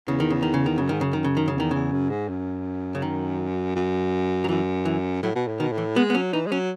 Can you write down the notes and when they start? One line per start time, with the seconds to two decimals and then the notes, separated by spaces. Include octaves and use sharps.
0.07 E2 C#3
0.20 D#3
0.30 C#3
0.43 D#3
0.54 C#3
0.66 D#3
0.78 F#2 C#3
0.89 G#2 D#3
1.01 F#2 C#3
1.13 D#3
1.24 C#3
1.37 D#3
1.48 C#3
1.55 E2 D#3
1.71 E2 C#3
1.92 F#2
2.10 G#2
2.29 F#2
2.95 C#3
3.02 D#3
3.75 F#2
4.44 F#3
4.49 F#2 E3
4.85 E3
5.23 A2 F#3
5.35 B2
5.47 A2
5.60 B2 D#3
5.72 A2
5.78 E3
5.96 G#3 B3
6.10 B3
6.15 F#3 C#4
6.33 E3 D#4
6.47 G#3
6.52 F#3 C#4